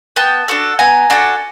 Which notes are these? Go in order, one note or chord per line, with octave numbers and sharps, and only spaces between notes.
B3 G5 A5
D4 F#4 A4
B3 G#5 A#5
D4 F#4 A4